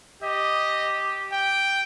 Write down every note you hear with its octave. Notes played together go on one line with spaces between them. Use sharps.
G4 D#5
G5